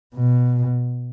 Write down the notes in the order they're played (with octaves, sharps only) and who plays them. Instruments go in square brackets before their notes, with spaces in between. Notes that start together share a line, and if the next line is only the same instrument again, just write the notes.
[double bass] B2